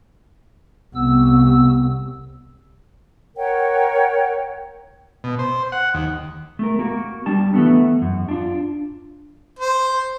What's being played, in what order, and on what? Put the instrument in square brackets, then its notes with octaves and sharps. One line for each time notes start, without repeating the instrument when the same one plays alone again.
[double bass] C2 [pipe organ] B3 E6
[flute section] A#4 C#5 F#5 G5
[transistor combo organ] B2
C5
F#5
D#2
[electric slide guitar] A3 A#4
A#3 F#4
G3 D4 A5
E3 A3 B3
F#2
D4 F4
[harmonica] C5